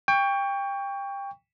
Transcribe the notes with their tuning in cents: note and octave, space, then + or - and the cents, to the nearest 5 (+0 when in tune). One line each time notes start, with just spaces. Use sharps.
G5 +25 C#6 +20